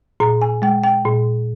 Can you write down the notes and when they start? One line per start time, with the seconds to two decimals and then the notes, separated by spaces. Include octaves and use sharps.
0.20 A#2 A#5
0.42 G#5
0.62 G#3 G5
0.84 G5
1.05 A#2